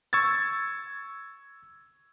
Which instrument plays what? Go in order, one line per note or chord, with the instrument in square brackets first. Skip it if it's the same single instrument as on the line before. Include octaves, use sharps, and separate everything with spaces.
[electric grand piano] C#6 E6 G#6 A6